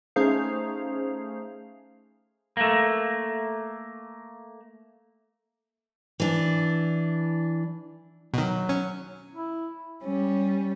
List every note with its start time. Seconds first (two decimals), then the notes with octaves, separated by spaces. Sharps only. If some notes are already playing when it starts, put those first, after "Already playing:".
0.16 A3 C#4 D#4 G#4 C5 F5
2.57 A3 A#3
6.20 E3 D4
8.34 B2 D#3 F#3
8.69 C#4
9.34 E4
10.03 G3 C#4